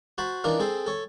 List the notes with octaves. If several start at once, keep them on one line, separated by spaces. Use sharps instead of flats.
F#4 C5 A5 B5
E3 D4 D#4 F4 A#4
C4 G#4 A4 C5
A4 C#5